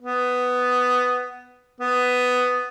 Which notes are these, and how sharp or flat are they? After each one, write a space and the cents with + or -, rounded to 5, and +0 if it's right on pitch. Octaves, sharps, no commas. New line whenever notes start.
B3 +10
B3 +10